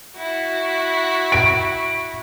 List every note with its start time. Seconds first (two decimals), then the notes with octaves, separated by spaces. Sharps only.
0.16 E4 F#4
1.32 D7